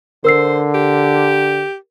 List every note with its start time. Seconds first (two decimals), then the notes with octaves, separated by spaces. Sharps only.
0.24 D3 A#4 C5 E6 C7
0.74 G4